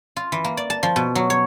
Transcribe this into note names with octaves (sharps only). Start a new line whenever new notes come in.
F4
E3
A#3
D5
A5
F3
B2
F#3
C#5